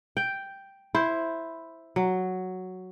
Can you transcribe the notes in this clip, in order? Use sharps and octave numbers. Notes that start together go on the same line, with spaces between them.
G5
E4 C5
F#3